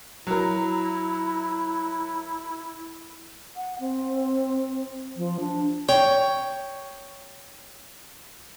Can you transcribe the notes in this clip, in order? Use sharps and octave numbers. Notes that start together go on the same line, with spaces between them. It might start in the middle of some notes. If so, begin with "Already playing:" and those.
F#3 E4 A#4
F#5
C4
F3
D4
C#5 G5